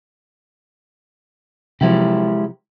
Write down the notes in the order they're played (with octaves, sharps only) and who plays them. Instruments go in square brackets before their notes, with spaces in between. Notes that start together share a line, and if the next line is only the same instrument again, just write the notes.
[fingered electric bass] C3 F3 F#3 [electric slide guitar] G#3 E4 G4